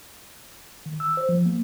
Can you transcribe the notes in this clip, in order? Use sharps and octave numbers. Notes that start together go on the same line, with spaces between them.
D#3
E6
C5
F3
A#3